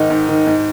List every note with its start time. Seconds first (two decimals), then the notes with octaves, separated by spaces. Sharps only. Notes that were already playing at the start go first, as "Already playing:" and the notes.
Already playing: G#2 D#3 D#4
0.10 G#2
0.29 D#3
0.47 G#2